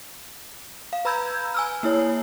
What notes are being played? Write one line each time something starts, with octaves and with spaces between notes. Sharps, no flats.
F5
B4 A#5 B5 E6 G6 G#6
G#5 E6 F6
A#3 E4 C#5